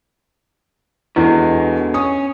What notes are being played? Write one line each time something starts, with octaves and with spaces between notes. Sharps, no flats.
E2 B2 D3 G#3
C#4 D#6